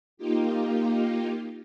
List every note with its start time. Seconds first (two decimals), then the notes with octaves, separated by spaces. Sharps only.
0.17 A#3 D#4 F4 G4